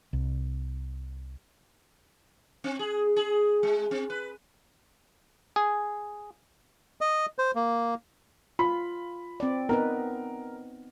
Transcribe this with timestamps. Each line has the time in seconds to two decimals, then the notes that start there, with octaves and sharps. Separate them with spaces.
0.13 C2
2.64 C4
2.79 G#4
3.16 G#4
3.63 G#3
3.91 C4
4.10 B4
5.56 G#4
7.01 D#5
7.38 C5
7.55 A#3
8.59 F4 B5
9.40 C4 D5
9.69 B3 D#4 A#4 B4